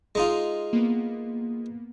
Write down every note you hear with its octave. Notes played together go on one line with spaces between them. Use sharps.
G#3 D#4 F4
A#3 B3